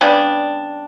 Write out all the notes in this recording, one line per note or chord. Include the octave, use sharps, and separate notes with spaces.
C#3 G3 B3 D4